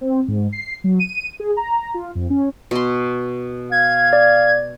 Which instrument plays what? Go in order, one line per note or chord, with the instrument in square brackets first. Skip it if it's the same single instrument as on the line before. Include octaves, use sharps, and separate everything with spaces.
[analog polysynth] C4
G#2
C7
F#3
D#7
G#4
A#5
F4
F2
C#4
[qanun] B2 C6
[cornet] F5 [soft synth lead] G#6
[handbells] D5